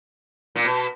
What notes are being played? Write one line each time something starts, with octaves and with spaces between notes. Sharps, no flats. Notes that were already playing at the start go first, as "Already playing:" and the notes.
A#2
B2